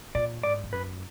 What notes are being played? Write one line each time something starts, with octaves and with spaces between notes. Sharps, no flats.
A#2 D5
G#2 D5
G#2
F#2 B4